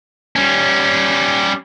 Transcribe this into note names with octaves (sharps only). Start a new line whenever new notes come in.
G3 C#4